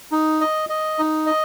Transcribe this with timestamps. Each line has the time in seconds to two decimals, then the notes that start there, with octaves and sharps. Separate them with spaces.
0.12 D#4
0.41 D#5
0.69 D#5
0.99 D#4
1.27 D#5